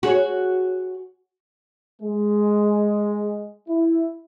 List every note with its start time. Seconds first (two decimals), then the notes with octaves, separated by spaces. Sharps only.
0.03 F#4 G#4 C#5
2.02 G#3
3.69 E4